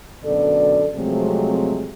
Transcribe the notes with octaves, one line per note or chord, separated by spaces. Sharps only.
F#2 B2 D3 A4 D5
C3 F3 F#3 G#3 A3 C4